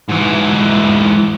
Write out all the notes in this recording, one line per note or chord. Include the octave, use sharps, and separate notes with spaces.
G#2 E3